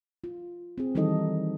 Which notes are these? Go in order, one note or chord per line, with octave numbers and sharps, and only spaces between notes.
F4
C4 G#4
D#3 E3 G3 D#4 A4 D#5